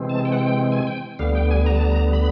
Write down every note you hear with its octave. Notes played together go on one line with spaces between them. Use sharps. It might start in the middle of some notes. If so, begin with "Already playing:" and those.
Already playing: C3 E3 G#3 C4
A5
G5
F#5
G5
G#5
G5
D2 D3 G3 B3 F5
G5
G#5
A#5
A5
A#5
B5